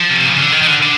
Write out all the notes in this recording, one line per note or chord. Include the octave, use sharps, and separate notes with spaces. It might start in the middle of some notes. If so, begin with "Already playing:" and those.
Already playing: F3
C3
C#3
D3
D#3
D#3
D3
D3